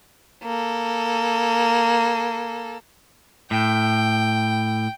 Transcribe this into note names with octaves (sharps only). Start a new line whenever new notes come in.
A#3 A4
A2 G5